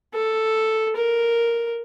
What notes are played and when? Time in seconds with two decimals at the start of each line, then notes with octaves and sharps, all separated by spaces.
0.14 A4
0.96 A#4